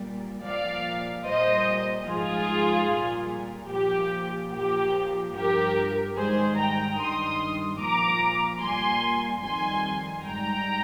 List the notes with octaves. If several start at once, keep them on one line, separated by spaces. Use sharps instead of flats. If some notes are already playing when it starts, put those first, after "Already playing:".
Already playing: A#2 G3
A#2 F3 D5 F5
A#2 G3 C5 D#5
G#2 F3 F4 G#4
A#2 G3
A#2 F3 G4
A#2 F3 G4
G2 F3 G4 A#4
G#2 D#3 G3 G#4 C5
G5 A#5
G2 D#3 G3 C6 D#6
A#2 F3 A#5 D6
A#2 G3 G#5 C6
F2 D#3 G3 G#5 C6
G#2 G3 G5 A#5